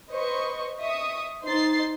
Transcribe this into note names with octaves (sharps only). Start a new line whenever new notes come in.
B4 C5 D#5 C#6
D#5 E5 C#6 D#6
D#4 C5 C6 A6 C7